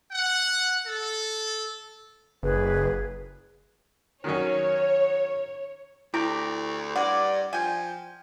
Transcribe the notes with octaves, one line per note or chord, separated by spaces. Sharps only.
F#5
A4
F#1 G#4 B4
D#3 F#3 C#4 C#5
D2 E4 G4 A#5 D6
G2 D5 F#5
F3 G5 G#5